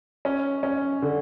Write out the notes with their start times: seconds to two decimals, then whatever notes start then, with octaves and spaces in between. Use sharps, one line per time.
0.25 C#4
0.63 C#4
1.02 D3